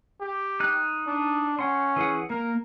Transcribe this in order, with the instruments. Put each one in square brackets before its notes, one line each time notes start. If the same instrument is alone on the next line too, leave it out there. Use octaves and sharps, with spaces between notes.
[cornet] G4
[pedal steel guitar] D#4 F#6
[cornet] D4
[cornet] C#4 [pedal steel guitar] F#5 C6
[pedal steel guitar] E3 G#4 F#5
[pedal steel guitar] A#3 [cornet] A#4